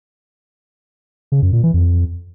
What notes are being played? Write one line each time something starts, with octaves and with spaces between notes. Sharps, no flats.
C#3
F#2
A#2
E3
F2